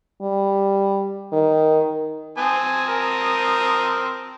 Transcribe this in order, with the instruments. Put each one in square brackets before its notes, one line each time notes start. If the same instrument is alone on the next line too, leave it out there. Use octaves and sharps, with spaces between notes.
[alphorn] G3
D#3
[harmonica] C4 A5 D#6 [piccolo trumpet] G#5
[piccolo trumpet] A#4